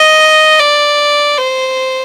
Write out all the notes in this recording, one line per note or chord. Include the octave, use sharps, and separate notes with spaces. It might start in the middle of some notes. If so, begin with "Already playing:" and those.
Already playing: D#5
D5
C5